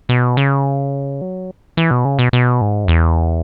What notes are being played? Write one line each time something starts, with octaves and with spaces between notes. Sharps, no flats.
B2
C#3
F#3
E3
B2
C#3
B2
B2
G#2
F#2
E2